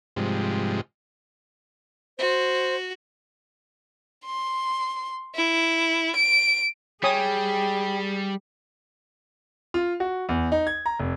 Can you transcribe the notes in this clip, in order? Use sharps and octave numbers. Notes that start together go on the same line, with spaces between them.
G#2 C3 F3 G3 G#3
F#4 C5
C6
E4
D7
G3 G#4 C#5 G5 G#5 D#6
F4
F#4
E2
D#4
G#6
A#5
F1